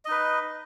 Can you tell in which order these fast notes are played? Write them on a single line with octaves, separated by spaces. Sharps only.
D#5 D#4 B4